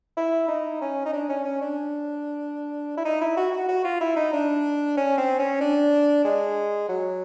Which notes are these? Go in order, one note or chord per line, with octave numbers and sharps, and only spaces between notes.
E4
D#4
C#4
D#4
D4
C#4
C#4
D4
E4
D#4
E4
F#4
F#4
F#4
F4
E4
D#4
D4
C#4
C4
C#4
D4
G#3
F#3